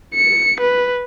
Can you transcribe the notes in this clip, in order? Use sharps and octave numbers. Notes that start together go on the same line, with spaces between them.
C#7
B4